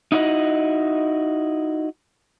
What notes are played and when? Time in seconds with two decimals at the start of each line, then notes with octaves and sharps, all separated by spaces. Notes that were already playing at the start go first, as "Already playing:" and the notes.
0.12 D#4 E4 F#4 A#4 D#5